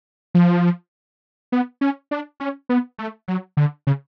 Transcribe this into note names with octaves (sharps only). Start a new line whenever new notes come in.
F3
B3
C#4
D4
C#4
B3
A3
F#3
D3
C#3